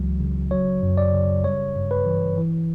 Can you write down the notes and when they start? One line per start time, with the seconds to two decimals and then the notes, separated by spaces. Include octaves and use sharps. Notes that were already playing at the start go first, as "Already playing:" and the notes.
Already playing: C#2 E3 F#3
0.20 C#3
0.51 F#3 C#5
0.82 F#2
0.98 D5
1.13 C#3
1.44 G3 C#5
1.76 G2
1.91 B4
2.06 E3
2.38 E3